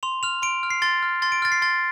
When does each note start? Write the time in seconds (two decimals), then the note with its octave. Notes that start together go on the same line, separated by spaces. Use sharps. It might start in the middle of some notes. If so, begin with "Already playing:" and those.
0.03 C6 F7
0.23 F6 F7
0.42 C6 D7
0.63 F6
0.70 C7
0.82 C6 A6
1.03 F6
1.22 C6 A6
1.32 D7
1.42 F6 A6
1.52 C7
1.62 C6 A6